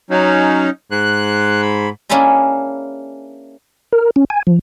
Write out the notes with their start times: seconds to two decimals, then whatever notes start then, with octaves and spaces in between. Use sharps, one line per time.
0.10 F#3 C#4 D#4
0.91 G#2 F#6
1.62 B5
2.09 A#3 C#4 D4 E4 G#4 D#5
3.93 A#4
4.16 C#4
4.30 G#5
4.47 F3